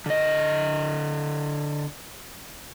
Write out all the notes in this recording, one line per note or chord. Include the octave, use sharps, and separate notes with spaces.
D3 D#5